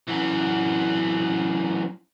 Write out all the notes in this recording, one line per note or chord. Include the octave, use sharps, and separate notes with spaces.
F#2 E3